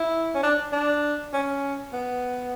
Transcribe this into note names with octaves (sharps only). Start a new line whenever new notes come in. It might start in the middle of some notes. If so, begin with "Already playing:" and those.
Already playing: E4
C#4
D4
D4
C#4
B3